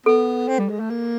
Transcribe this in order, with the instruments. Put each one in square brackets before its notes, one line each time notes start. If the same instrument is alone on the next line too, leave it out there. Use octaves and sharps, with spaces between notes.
[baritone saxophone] B3 [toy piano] A4
[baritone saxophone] C4
G3
G#3
A3
A#3